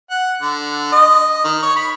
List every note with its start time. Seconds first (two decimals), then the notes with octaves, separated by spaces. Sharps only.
0.10 F#5
0.42 D3
0.92 D#5
1.44 D#3
1.63 C#5
1.76 B5